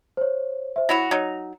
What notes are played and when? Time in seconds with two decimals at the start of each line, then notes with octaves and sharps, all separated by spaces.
0.17 C5 C#5
0.76 C5 E5
0.89 F#3 E4 F#4 A#6 F7
1.11 F#3 D#4